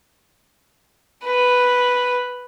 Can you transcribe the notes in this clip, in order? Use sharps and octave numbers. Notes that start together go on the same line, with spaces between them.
B4